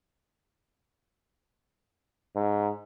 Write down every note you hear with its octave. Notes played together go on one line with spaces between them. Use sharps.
G#2